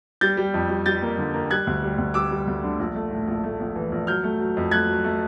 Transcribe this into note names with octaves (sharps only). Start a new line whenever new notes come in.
G3 G6 A6
G3
F2
G3
G3 G6 A6
A#3
D3
A#3
G3 F#6 G#6
D2
G3
D2
G3 D6 E6
G3
D2
D3
A#1
A3
A2
A#1
A3
A#1
E3
A#1
F#3 F6 G6
A3
F#3
F2
A3 F#6 G#6
F#3
A3